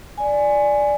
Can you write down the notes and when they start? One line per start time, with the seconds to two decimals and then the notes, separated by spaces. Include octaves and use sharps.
0.18 D5 G#5